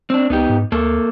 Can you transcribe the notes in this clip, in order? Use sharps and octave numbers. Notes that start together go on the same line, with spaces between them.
C4 D4
C#2 B3 D#4 G4
G#2
D2 A#3 A4